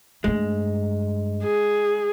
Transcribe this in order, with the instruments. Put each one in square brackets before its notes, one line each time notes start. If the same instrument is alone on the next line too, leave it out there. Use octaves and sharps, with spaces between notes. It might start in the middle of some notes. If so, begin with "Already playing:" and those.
[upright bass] G2 A3 [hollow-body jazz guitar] G#3
[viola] G#4